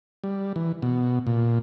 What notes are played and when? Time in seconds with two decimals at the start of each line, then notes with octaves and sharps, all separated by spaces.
0.24 G3
0.56 E3
0.82 B2
1.27 A#2